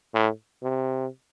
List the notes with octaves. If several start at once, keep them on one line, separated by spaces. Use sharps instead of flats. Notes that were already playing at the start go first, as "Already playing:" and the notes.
A2
C3